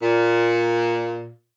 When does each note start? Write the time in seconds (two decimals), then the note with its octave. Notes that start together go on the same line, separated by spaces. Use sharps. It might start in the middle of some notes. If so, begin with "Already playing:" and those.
0.03 A#2